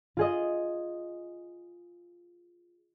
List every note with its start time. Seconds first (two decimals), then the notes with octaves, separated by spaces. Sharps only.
0.17 F4 G#4 D#5